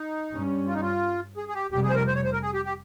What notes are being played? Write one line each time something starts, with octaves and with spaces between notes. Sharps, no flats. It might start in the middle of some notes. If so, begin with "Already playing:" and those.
Already playing: D#4
G2 G3 C#4
F4
D#4
F4
G#4
G#4
G4
F1 F2 C3 G3 G4
G#4
C5
A#4
C5
C#5
C5
A#4
G#4
G4
G4